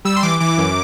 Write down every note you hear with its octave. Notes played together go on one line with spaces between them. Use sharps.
G3 E6
C6
E3 D6
E3 D6
F#2